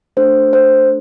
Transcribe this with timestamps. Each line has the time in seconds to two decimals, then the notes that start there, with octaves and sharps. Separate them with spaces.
0.17 A3 D4 A4 C5
0.53 C5